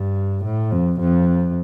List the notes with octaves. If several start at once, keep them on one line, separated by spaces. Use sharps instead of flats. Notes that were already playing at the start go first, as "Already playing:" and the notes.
Already playing: G2
A2
F2
F2